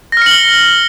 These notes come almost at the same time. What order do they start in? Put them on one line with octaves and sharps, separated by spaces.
A#6 F6 C#7 F#7 G7